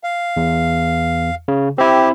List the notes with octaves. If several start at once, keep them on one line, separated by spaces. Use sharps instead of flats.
F5
E2
C#3
C4 E4 G4